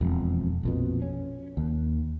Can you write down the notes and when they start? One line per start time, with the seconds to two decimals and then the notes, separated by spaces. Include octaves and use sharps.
0.01 E1 F2
0.63 A#1 F2 B2
1.02 C#4
1.57 D#2